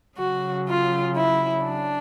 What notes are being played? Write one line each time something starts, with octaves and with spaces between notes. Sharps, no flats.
C#3 F#3 F#4
F4
E4
D4